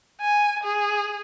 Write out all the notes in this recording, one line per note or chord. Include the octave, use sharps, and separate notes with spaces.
G#5
G#4